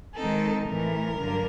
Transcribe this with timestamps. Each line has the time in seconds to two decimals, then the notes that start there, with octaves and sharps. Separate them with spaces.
0.15 D#3 G#3 C4 D#4 A4
0.67 A2 E3 A3 A#4
1.17 G2 D3 F#3 A#3